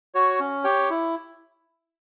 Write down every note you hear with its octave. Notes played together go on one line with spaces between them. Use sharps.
F#4 C#5
C#4
G4 C#5 G5
E4